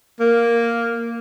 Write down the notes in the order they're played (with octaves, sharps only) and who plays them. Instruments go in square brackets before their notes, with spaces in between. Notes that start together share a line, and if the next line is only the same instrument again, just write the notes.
[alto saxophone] A#3